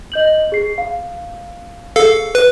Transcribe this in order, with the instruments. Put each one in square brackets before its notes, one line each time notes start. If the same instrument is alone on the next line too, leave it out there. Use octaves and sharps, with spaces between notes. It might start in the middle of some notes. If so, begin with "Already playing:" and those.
[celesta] D#5 G6 F#7
G#4 C7
F5
[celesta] G#4 [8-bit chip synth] A4 F5
[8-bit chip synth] B4